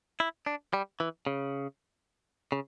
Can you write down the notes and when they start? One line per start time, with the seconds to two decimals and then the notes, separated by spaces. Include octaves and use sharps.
0.20 E4
0.46 D4
0.73 G3
1.00 E3
1.27 C#3
2.52 C#3